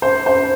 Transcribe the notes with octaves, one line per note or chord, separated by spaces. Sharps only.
C5
C5